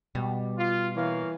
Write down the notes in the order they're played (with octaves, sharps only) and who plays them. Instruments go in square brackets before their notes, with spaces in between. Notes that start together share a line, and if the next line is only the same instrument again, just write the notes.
[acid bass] B2 [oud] G3
[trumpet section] F4
[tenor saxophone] E3 [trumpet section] A#3 C#5 F5